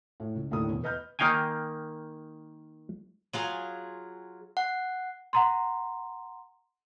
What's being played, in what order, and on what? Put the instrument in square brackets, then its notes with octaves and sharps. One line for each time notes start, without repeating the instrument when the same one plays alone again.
[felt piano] A2
C#2
D#2 A2 D3 E4 D#6
E2 B2
B4 D#5 F6 G6
[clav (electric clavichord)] D#3 A#3 D#4 F5 G5 G#5
[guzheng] F#3 F4 G#4
[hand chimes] F#5
[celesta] F#5 A#5 C6